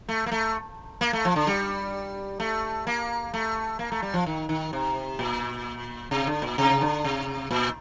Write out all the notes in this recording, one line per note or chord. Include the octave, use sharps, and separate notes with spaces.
A3
A#3
A3
A#3
A3
F3
D3
G3
A3
A#3
A3
A#3
A3
G3
F3
D#3
D#3
C3
A#2
C3
D3
A#2
C3
D3
C3
A#2